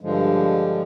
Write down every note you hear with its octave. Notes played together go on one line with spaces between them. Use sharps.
G2 D3 F3 G#3